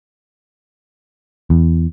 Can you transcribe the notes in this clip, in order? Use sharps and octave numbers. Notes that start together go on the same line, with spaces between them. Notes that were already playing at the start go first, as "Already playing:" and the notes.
E2